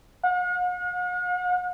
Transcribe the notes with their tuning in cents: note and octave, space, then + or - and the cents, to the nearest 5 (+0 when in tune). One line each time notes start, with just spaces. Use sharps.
F#5 -45